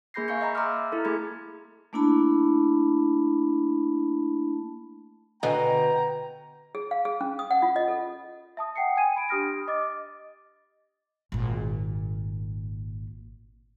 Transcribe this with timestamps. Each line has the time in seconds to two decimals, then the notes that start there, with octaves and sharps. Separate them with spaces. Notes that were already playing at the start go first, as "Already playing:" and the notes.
0.14 A#3 G#4 B5 G6 A#6 C7
0.28 E5 F5 G#5 C#6 G6 C#7
0.41 D#5 E5 A#5 B5
0.55 A#5 C6 D6 E6 F6
0.92 E4 A4
1.05 A3 A#3 G#4 B5 G#6
1.93 A3 A#3 D4 E4 A5 B5
5.43 B2 D3 D#5 G5 G#5 A#5
6.75 G#4
6.91 F5
7.05 G#4
7.21 C#4
7.39 D#6
7.51 F#5
7.62 F4
7.76 D#5
7.88 A4
8.57 E5 A5 D#6
8.76 F#5 G5 C7 C#7
8.96 G5 G#5 G#6 D#7
9.16 B5 D7
9.29 D4 G4 D#6 F6 A#6 D7
9.68 D#5 D6 A6
11.32 G#1 A#2